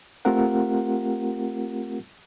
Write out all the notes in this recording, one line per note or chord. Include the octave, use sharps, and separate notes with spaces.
A3 C4 F4 G4 A#4 F#5